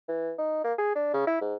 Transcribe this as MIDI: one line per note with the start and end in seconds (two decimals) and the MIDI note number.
0.09 0.33 52
0.38 0.61 63
0.64 0.73 58
0.78 0.94 68
0.95 1.09 62
1.14 1.25 49
1.27 1.38 64
1.41 1.55 44